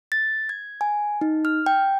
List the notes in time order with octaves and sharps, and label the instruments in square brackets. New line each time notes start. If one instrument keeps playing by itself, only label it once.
[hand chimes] A6
G#6
G#5
D#4
F6
G5